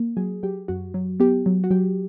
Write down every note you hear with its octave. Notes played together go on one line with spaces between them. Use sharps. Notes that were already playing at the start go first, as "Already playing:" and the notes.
Already playing: A#3
F#3 G#4
F#3 G4
F#2 F#4
F#3
B3 G4
F#3
F#4
F#3 G4